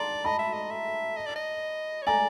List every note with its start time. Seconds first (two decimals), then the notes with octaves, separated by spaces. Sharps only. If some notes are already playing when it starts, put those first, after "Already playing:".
Already playing: D5 A5 A#5 C6
0.24 D#5 A5 B5
0.39 E5
0.53 D#5
0.70 E5
1.17 D#5
1.26 D5
1.36 D#5
2.02 C#5
2.06 D5 G#5 A#5